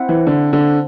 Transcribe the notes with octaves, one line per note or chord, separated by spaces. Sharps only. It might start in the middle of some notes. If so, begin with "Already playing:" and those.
Already playing: C4 E4 F#5
E3
D3
D3